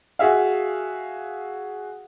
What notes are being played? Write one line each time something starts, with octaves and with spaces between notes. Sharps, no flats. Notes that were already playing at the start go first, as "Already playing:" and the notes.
F#4 G#4 E5 F5